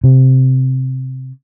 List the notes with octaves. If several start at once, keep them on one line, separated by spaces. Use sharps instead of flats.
C3